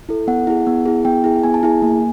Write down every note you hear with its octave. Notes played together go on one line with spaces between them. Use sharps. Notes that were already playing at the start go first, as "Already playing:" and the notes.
E4 A4
B3 F#5
E4 G#4
B3
E4 G#4
B3 G5
E4 G#4
B3 G#5
A5
E4 G#4 G#5
A#3